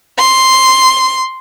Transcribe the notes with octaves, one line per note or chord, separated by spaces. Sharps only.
C6